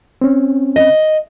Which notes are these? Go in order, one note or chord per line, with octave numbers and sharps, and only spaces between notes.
C4 C#4
D#5